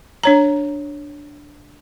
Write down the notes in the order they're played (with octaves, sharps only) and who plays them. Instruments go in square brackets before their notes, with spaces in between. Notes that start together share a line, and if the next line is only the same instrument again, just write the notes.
[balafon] D4 C#5 A#5